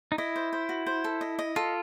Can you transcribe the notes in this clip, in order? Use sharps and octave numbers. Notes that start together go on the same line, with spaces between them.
D#4
E4 D#5
C5
C5
F#4
C5
A4
D#5
D#5
F4 A4